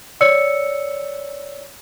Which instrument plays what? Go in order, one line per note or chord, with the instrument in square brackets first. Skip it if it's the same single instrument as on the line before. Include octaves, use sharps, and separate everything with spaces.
[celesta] C#5 D5 E6 C#7